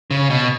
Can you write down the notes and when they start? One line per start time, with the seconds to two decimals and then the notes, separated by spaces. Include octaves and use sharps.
0.11 C#3
0.30 B2